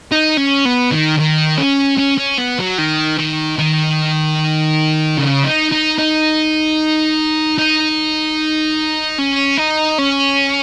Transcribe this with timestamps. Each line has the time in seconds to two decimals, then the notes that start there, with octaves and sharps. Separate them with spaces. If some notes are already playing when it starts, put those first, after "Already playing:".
0.12 D#4
0.37 C#4
0.65 B3
0.91 D#3
1.19 D#3
1.58 C#4
1.98 C#4
2.18 C#4
2.38 B3
2.59 F#3
2.78 D#3
3.19 D#3
3.58 D#3
5.18 C#3
5.44 D#4
5.72 D#4
5.99 D#4
7.58 D#4
9.19 C#4
9.58 D#4
9.99 C#4